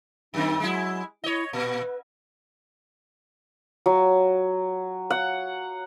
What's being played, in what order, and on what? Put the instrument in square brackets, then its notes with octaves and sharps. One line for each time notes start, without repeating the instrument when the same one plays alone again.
[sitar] F#2 D#3 C4 [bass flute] D#4
[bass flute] F#3 [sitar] G#3 E4
[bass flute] E4 [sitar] C#5 D#5
[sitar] A#2 [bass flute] B4
[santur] F#3
F#5